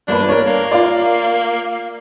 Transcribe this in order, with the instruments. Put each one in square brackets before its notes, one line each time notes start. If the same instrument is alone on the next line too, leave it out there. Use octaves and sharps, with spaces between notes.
[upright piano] G1 A#3 B4 [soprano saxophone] D4
[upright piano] A#4 C#5
[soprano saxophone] A#3
[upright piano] F4 D5